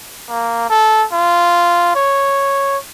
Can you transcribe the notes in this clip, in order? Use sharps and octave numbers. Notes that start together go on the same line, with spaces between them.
A#3
A4
F4
C#5